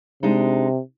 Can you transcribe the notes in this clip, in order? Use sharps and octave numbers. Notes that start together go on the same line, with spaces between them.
C3 G#3 D4 D#4